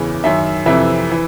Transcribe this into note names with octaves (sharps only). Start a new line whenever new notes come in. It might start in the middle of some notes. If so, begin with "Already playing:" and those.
Already playing: E2 C#3 E3
F#2 D#3 E5
F2 C3 E3 E5
E3